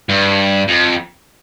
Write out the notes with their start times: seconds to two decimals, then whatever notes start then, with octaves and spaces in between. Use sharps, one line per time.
0.09 G2
0.68 F2